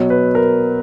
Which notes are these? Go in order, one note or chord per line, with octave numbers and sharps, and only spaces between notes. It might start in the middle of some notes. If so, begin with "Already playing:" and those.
Already playing: B2 F#3 C#5
B4
A#4